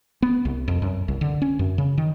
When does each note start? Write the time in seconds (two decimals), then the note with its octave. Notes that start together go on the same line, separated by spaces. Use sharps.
0.22 B3
0.45 C2
0.68 F2
0.82 F#2
1.08 C2
1.21 D3
1.42 C#4
1.59 F#2
1.78 C#3
1.98 D#3